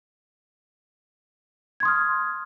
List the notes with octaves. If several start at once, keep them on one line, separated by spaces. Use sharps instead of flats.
C6 D#6 F6 G#6